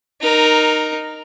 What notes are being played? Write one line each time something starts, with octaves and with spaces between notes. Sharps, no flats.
D#4 A#4